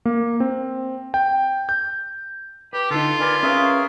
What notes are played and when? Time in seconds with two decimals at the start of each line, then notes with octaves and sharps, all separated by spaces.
0.05 A#3
0.40 C4
1.14 G5
1.69 G6
2.73 G4 B4
2.91 D3 D#4 F4 A4
3.20 A#4 B4 D5 G#5
3.43 C#4 G#4 A#4 B4 E5 F5